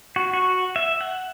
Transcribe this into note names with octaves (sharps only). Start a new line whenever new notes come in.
F#4
F#4
E5
F#5